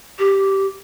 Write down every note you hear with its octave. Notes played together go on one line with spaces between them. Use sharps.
G4